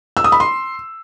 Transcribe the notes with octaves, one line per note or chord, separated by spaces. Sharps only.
E6
D#6
B5
C6